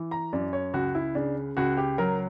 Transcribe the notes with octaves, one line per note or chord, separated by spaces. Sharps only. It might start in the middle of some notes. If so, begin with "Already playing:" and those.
Already playing: E3
A#5
F#2 D5
C#5
C#2 F#4
E4
C#3 D4
C#2 F#4
G4
F#3 A#4